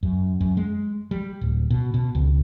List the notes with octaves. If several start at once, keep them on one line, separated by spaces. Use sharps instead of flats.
F#2
F#2
G#3
G3
D1
B2
B2
C#2